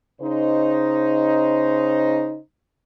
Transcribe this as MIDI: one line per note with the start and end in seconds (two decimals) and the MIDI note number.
0.21 2.39 49
0.21 2.39 63
0.21 2.39 72